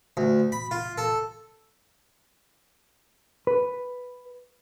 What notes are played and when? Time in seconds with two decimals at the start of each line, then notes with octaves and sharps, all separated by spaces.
0.17 D2
0.52 B5
0.71 F4
0.98 A4
3.47 B4